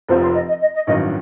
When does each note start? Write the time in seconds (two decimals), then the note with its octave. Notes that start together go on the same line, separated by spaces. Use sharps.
0.08 F1 F2 C3 F3 C5
0.22 C5
0.35 D#5
0.48 D#5
0.61 D#5
0.74 D#5
0.86 A1 G2 D#3 F#3 D#5